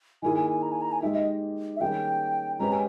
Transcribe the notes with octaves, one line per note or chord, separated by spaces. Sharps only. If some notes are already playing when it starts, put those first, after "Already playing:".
D#3 A#3 E4 G#4 G#5
G#5
G#5
A#5
G#5
A#5
G#5
G#3 D#4 G4 E5
D#5
E5
D#3 G3 A#3 C#4 G#4 G5
G#3 C#4 G4 B4 A#5
G#5